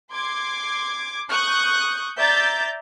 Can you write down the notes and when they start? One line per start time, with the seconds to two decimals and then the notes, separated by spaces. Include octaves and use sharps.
0.12 C6 D6 G#6
1.29 C#6 D#6 F#6 G6
2.19 D5 E5 A#5 G6 A6